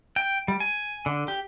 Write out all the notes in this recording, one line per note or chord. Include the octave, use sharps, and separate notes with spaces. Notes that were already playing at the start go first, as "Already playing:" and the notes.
G5
G3
G#5
D3
G4